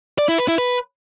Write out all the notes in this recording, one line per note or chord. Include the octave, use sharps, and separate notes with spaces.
D5
E4
B4
E4
B4